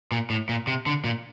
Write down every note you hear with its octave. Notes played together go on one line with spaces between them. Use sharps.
A#2
A2
A#2
C3
D3
A#2